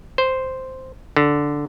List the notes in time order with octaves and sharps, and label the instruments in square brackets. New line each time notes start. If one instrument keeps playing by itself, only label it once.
[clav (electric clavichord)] C5
D3